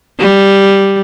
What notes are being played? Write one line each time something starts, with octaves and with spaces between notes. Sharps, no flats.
G3